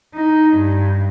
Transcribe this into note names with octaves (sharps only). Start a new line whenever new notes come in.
D#4
G2